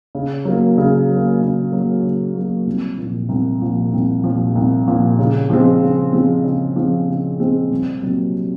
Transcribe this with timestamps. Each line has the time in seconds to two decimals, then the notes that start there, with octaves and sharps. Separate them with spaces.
0.15 C#3
0.45 F#3 A#3
0.78 C#3
1.09 F#3 A#3
1.41 C#3
1.72 F#3 A#3
2.03 C#3
2.35 F#3 A#3
2.67 C2
2.98 A#2 F3
3.29 C2
3.62 A#2 F3
3.93 C2
4.24 A#2 F3
4.55 C2
4.88 A#2 F3
5.19 C#3
5.50 F3 G#3 C4
5.82 C#3
6.13 F3 G#3 C4
6.44 C#3
6.76 F3 G#3 C4
7.08 C#3
7.40 F3 G#3 C4
7.71 C2
8.02 C3 F#3 A#3